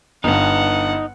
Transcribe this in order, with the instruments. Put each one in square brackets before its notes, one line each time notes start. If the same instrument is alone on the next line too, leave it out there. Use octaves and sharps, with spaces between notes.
[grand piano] G1 G2 [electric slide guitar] D#4 [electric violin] F#5